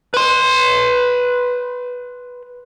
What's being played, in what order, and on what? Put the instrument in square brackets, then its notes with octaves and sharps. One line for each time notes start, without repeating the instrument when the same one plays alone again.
[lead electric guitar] B4 C6